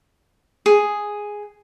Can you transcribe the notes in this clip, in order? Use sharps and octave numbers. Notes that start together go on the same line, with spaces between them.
G#4